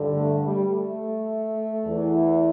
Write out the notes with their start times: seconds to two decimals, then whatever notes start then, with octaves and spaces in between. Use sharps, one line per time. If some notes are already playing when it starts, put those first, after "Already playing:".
Already playing: G2 D3
0.15 A3
0.44 G3
0.72 A3
1.85 E2 E3